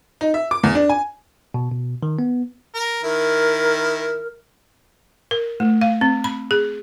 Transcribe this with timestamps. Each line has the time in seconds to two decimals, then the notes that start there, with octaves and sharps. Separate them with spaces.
0.21 D#4
0.34 E5
0.51 D6
0.63 E2
0.75 D4
0.89 G#5
1.54 B2
1.72 B2
2.03 D#3
2.19 B3
2.74 A#4
3.03 D#3 E4 A#4
5.31 A#4
5.60 A3
5.81 F5
6.01 C4
6.24 B5
6.51 G#4